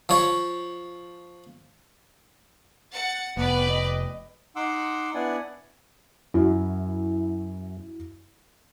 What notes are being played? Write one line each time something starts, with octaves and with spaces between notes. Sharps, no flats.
F3 C#5
F#5 A6 C#7
F1 B3 B4 D5 G5
D#5
D#4 F#5 C6 D6 E6
B3 D4 E4 D5 F#5 G#5
F#2 E4 F#4